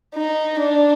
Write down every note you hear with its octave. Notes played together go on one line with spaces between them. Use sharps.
D#4
D4